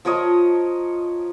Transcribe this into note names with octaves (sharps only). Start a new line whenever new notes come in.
F3 A#4 C#5 D#5